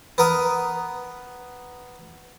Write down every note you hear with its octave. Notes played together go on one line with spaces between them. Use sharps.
B3 A#4 D#6